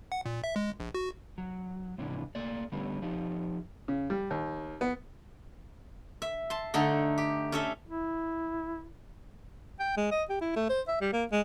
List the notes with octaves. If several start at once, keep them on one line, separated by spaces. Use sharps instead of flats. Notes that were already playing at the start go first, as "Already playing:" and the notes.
F#5
A#2
E5
G#3
A#1
F#4
F#3
G#2 C3 E3 D4
A3 A#3 D5
D3 G3 A3 B3 C#4
F3 D#4 G4
C#3
G3
D#2
B3
E5
A5 C6
D3 A3 D#4 A4
G4
C#4 A4 E5
E4
G5
G#3
D#5
G4
E4
A3
C5
E5
G3
A#3
G#3